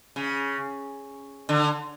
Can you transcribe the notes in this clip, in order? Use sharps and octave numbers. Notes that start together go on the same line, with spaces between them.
C#3
D3